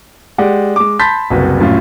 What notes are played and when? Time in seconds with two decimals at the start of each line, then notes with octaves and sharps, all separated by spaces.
0.38 G#3 G4 D5 F#5
0.76 G#3 D6
0.99 A5 B5 C6 G6 A6 B6
1.30 F#1 C2 F#4 B4
1.59 D#1 F#2 A2 F4